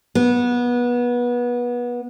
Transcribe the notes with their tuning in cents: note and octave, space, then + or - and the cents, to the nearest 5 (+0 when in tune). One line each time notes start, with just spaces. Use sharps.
B3 -25